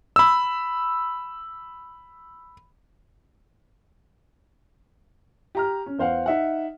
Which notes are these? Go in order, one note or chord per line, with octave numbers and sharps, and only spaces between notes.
B5 E6
G4 A#5 F6
C#4
E2 C5 F5 F#5
D#4 E5 F#5